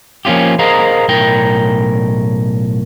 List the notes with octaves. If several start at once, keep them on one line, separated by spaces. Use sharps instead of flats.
F3 A#3 C#4 F4 G4
G#4 A#4 C5 D#5 F5 A#5
B1 A2 A#4 G5